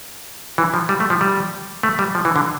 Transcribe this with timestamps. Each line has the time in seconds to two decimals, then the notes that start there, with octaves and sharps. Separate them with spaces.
0.58 E3
0.74 F3
0.89 G3
1.00 A3
1.10 F3
1.21 G3
1.83 A3
1.99 G3
2.15 F3
2.25 E3
2.36 D3